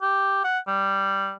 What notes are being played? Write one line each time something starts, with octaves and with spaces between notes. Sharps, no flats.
G4
F#5
G3